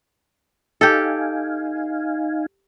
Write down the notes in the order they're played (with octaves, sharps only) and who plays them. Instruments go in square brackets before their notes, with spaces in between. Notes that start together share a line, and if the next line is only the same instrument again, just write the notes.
[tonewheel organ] D#4 F5 G#5 [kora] G4 A4